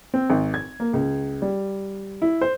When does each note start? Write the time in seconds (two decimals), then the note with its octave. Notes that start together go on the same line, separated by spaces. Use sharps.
0.14 C4
0.30 G#1
0.54 G#6
0.80 A#3
0.93 C#2
1.42 G3
2.22 E4
2.41 C5